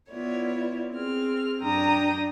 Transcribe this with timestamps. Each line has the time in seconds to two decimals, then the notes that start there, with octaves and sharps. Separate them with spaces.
0.12 B3 E4 F4 C#5 D5
0.93 C4 G#4 F6
1.61 F#2 D4 G5 A#5 D#6